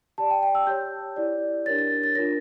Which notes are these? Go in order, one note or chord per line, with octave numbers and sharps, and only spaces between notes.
G4 D5 A5
G5
G5
E6
G4 C#5 G6
E4 G4 D5
D4 G4 A#4 C#5 A6
A6
A6
D4 F4 A#4 C#5 A#6